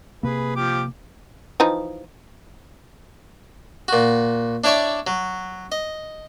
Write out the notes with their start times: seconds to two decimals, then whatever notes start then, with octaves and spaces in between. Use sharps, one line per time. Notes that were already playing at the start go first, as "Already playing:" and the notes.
0.23 C3 A#3 G#4 B4
0.56 F3 G4 D6
1.60 E3 F3 D#4
3.88 A#2 F#4
4.64 D4 E4 C#5 D5 E5 C#6
5.07 F#3
5.72 D#5